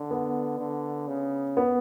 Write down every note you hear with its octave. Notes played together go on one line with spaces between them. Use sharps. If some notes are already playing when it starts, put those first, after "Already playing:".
Already playing: D3
B3
D3
C#3
B3